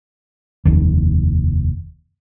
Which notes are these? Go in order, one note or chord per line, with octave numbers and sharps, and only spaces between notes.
F1 D#2